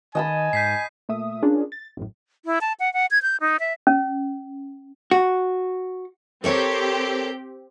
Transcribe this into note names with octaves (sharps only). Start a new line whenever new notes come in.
D#3 D#5 G#5 A5 B5
G#2 G6 B6 C7
A#2 A3 E5 D#6
C#4 D4 F4 G#4 A#4
A6
A1 F#2 A2
E4
A5
F#5
F#5
G#6
G6
D#4
E5
C#4
F#4
C4 G4 A4 A#4 C#5